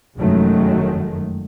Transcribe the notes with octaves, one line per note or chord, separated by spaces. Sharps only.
F1 F#2 D#3 F#3 G#3 A3